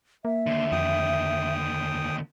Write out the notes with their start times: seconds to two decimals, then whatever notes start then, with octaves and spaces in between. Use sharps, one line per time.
0.25 A#3 E5
0.46 D#2 D3 C6
0.72 F2 G5 D#6